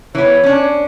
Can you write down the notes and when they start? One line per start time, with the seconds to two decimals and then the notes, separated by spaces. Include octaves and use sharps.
0.15 E3 B3 C#5
0.44 C#4 D4